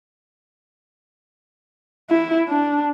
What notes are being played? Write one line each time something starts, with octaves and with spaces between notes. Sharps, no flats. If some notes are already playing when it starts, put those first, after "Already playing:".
E4
D4